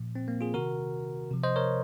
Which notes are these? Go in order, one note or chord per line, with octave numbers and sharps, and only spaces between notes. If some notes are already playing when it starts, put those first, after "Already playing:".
Already playing: A#2 F3
C4
A#3
F4 G#4
C3 D#3 F#4 A#4
C3 F3
C5 D#5
A#4 C#5